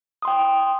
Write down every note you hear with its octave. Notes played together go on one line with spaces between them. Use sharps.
G5 C6 D#6